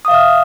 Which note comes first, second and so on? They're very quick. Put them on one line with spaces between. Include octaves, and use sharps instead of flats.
D#6 F5 E5 F6